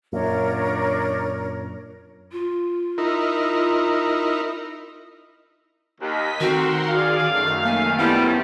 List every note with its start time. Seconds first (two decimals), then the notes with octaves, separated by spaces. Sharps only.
0.13 F#2 A#2 D4 A#4 C#5
2.32 F4
2.98 D#4 E4 A#4
6.01 D#2 D#5 B6
6.41 D#3 A3 C4 F#4 A#4 F#5 C6
6.88 G#4 D5 F5
7.27 F#2 D#3 A3
7.65 A#3 G#5
7.98 F3 G3 B3 E4